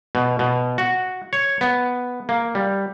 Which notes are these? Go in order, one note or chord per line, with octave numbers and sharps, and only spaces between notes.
B2
B2
F#4
C#5
B3
A#3
G3